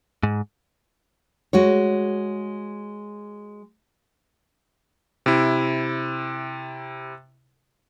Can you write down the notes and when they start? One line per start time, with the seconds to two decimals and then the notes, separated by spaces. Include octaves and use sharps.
0.23 G#2
1.53 G#3 F#4 C#5
5.26 C3 E4